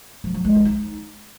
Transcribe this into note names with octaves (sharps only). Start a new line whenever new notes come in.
F3
F3
G#3
D#4
D#4